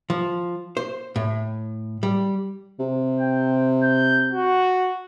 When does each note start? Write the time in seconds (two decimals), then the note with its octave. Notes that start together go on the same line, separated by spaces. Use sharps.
0.10 F3
0.77 C5
1.16 A2
2.03 G3
2.79 C3
3.20 G5
3.83 G6
4.32 F#4